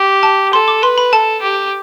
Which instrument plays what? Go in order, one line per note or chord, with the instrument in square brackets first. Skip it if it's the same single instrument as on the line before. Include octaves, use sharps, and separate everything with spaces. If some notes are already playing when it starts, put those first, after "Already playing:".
Already playing: [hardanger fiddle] G4
[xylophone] A5
[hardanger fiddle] A4 [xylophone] C6
[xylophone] D6
[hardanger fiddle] B4 [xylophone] C6
[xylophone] B5
[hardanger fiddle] A4 [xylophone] A5
[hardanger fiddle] G4